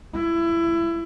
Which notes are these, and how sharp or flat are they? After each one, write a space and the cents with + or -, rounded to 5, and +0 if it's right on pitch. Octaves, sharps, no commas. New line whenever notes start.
E4 +25